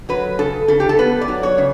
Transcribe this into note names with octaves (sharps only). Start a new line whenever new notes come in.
F#3 B4
C#3 A4
C#3 A4
G4
A4
B3 B4
D5
F#3
C#5
C#3